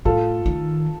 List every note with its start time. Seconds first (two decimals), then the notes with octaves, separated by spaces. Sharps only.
0.05 A2 F4 A4
0.46 D#3